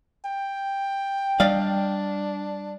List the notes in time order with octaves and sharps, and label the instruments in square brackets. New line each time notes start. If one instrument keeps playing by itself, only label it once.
[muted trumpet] G5
[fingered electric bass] G3 [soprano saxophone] D4 [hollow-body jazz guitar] D5 D#5 F5